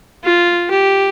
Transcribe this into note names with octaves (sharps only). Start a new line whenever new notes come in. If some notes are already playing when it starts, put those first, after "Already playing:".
F4
G4